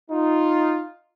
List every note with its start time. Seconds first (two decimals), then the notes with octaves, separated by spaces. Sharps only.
0.11 D#4 F4